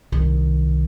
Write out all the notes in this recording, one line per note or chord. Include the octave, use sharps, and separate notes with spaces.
C2 D#3